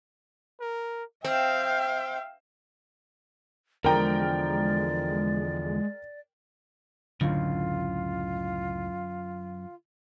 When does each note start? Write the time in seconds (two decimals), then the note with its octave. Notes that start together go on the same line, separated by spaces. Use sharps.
0.60 A#4
1.24 C4 E5 F5 G5
3.85 E2 D3 F3 G#3 A#4 D5 G5 A#5
7.21 C#2 F#2 A2 D3 F4